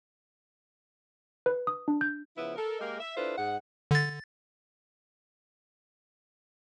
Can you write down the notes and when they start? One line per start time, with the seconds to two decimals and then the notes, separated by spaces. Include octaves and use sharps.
1.46 B4
1.67 D#6
1.88 D4
2.01 G6
2.36 C#3 F3 B3 E4
2.56 A4 A#4
2.79 G#3 A#3 G4 A#4 D#5 F5
2.99 E5
3.16 D4 E4 F4 A4 B4 C5
3.37 G#2 F#5
3.91 D3 A6